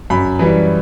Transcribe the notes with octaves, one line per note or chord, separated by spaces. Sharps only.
F#2 B5
E3 G3